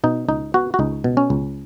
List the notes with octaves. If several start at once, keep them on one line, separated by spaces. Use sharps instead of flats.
B2 D#4
C#2 D#4
B3 F#4
F#4
C#2 D#4
B2
C#4
C#2